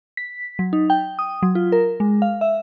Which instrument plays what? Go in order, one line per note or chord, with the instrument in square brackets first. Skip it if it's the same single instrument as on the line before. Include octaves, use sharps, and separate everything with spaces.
[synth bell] B6
F#3
D#4
G5
D#6
F#3
F4
A#4
G#3
F5
E5